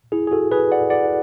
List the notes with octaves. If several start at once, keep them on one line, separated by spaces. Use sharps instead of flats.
E4 G#4
G#4
F#4 A4
G#4 B4
D5 F#5
D5 F#5